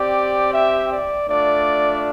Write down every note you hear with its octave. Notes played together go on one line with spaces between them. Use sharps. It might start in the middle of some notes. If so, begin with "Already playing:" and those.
Already playing: C4 G4 D5
E5
D5
A3 D4 F4 D5